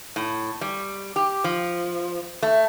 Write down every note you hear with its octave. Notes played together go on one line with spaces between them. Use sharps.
A2
G3
G4
F3
A3